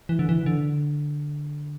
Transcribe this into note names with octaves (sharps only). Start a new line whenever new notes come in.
E3
D3
E3
D3